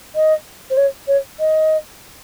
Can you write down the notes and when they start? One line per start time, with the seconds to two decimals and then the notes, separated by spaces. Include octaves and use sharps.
0.15 D#5
0.70 C5
0.77 C#5
1.07 C#5
1.39 D#5